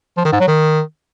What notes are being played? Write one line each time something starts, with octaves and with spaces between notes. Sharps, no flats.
F3
D#3
G#2
F#3
D#3